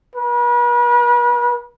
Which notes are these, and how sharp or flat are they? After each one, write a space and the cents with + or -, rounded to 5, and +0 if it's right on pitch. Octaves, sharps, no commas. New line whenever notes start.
B4 -40